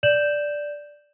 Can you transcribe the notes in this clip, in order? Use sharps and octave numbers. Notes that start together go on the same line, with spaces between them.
D5 G6 E7 F#7